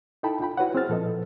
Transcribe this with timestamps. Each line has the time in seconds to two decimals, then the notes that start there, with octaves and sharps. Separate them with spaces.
0.23 D#4 E4 A4 G5 A5 B5
0.40 D4 F4 G5 B5
0.57 E4 F#4 B4 C#5 F#5
0.75 C4 E4 G#4 C5 F6 A6
0.89 A#2 F3 A4 B4 D#5